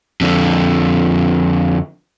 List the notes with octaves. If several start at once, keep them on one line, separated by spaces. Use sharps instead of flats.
F2 D3